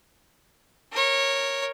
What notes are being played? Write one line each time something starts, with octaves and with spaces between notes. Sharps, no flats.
A#4 C#5